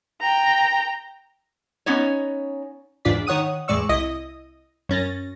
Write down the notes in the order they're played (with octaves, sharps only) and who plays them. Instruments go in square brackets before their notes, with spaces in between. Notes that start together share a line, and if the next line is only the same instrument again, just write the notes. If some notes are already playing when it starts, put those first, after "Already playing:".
[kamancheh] G5 A#5
[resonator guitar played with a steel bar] B3 C#4 D#4 C#5
[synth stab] E2 G#2 D4 F4 D5 B6
D#3 C#5 F#5 D#6 D#7
E2 A2 G#3 D5 C#6 E6
C2 E4 D#5 D#6 A#6
F#2 C#4 A6 A#6